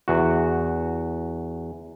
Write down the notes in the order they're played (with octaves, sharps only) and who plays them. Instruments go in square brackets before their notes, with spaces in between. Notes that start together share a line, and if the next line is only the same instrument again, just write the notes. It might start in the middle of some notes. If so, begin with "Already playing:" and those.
[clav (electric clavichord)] E2 F#4